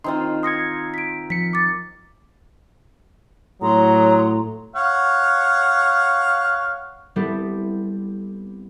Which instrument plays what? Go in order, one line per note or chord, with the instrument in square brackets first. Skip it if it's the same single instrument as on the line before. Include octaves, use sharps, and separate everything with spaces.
[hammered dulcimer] D#3 C4 F4 [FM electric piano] D#4 C6
[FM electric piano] C6 G#6 [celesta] D#6 A#6 C#7
[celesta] B6 D7
[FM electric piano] F3 C#7 [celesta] B6
[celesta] D6 A6
[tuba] A2 [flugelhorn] F#3 [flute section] A#5 C6 D#6
[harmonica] C#5 F5 F#5
[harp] G3 B3 C4 E4 G4 A4